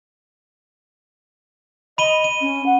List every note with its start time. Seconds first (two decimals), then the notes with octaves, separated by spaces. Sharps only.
1.98 D#5 B5 D#7 G7
2.24 D#7
2.41 C#4
2.66 F#5